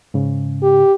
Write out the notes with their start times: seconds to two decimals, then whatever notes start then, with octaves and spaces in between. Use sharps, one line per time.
0.14 G#2 C#3
0.63 G4